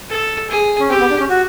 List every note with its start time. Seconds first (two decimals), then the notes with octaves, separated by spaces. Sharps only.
0.10 A4
0.50 G#4
0.80 C#4
0.90 C4 G4
1.00 B3
1.10 D4
1.20 C#4
1.30 F#4